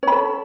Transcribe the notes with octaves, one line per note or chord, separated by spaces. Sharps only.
A4 C#5 B5